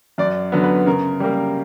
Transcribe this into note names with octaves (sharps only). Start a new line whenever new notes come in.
F#2 D5
D3 F#3 B3
B4
C#3 A#4
G3 A#3